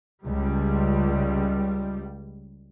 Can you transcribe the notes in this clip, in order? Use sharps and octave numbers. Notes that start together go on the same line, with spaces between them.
C#2 G3